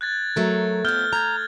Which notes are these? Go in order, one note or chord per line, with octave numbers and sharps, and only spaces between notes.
F#6 G#6 A6
F#3 A3 A#4
F2 B3 F6 G6 G7
A#5 G6 G#6